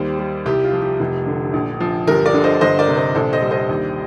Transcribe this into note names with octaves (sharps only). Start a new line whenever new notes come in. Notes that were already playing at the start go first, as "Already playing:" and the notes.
Already playing: D#2 G3 C5
G3
C2 G4
F4
F3
G4
F1
D3
A#1
F3
G1 G4 A#4
A#4 D5
D3
C5 D#5
G1 C5 D#5
A#4 D5
C3
C5 D#5
A#1 A4 C5
C5 D#5
G3
C5 D#5
D#2